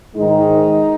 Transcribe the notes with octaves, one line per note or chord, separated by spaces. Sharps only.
G#2 D#3 G#3 D#4